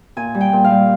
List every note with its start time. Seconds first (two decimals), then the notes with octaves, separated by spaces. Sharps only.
0.16 A#2 G#5
0.34 G3
0.41 G5
0.53 A#2
0.64 F5
0.70 G3